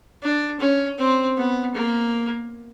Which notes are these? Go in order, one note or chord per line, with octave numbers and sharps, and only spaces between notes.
D4
C#4
C4
B3
A#3